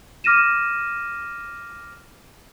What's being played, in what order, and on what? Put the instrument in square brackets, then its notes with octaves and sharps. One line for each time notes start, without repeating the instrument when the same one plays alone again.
[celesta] D6 F6 A#6 D#7 E7